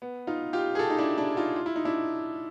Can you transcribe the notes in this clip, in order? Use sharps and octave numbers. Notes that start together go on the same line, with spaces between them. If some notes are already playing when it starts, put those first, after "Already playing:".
B3
D#4 F4
F4 G4
G#4
G4 A4
D#4
D4 E4
D4 E4
D#4 F4
F4
E4
D#4
D4 E4